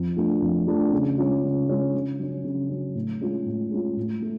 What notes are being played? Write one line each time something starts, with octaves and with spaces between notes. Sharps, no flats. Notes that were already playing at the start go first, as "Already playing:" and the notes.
Already playing: F2
F3 A3 D4
F2
F3 A3 D4
C#3
G#3 C#4 F4
C#3
G#3 C#4 F4
C#3
F#3 C#4
C#3
F#3 C#4
A2
G#3 C#4 F4
A2
G#3 C#4 F4
A2
A3